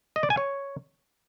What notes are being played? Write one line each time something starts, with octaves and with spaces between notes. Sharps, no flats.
D#5
D5
G#5
C#5